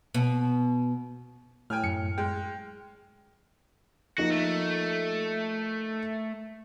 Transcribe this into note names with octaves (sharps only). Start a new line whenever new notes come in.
B2
A2 G5 G#5 F6
F#2 C#7
G#3 G5
F3 A#3 D#4 F#4
A3